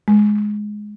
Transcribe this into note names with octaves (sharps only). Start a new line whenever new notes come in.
G#3